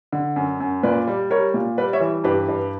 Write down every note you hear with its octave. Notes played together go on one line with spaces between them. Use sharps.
D3
F#2
F#2
A#2 B4 D5
G3
G3 A#4 C#5
A#2
G3 B4 D5
C#5 E5
E3
G2 G4 B4
G2